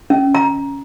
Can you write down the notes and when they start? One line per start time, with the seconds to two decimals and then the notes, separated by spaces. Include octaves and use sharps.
0.10 C#4
0.35 A#5